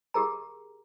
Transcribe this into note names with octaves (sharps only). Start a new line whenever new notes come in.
G4 G#4 A#4 A#5